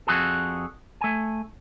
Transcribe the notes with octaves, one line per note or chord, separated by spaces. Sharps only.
F2 F#4 G#4 A4
A3 G#5